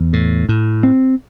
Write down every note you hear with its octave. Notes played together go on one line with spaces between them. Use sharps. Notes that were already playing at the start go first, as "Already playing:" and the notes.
Already playing: E2
A2
A2
C4